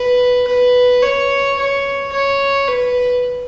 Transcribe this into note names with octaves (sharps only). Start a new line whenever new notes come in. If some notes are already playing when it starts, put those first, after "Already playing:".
Already playing: B4
B4
C#5
C#5
C#5
B4